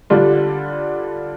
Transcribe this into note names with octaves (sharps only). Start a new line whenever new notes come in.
D3 G3 D4 F4